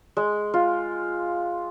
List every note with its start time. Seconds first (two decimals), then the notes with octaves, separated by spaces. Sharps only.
0.17 G#3
0.54 F4